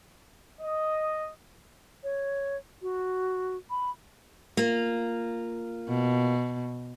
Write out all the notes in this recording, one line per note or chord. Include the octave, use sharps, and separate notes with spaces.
D#5
C#5
F#4
B5
A#3 F4
B2